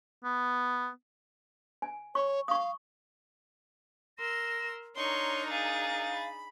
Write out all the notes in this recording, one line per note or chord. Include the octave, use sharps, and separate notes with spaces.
B3
G#5
C#5 C#6
F5 C#6 D#6
A#4 C6 E6 A#6
D4 D#4 A#4 C#5 C6 C#6
G#4 F5 A6
B5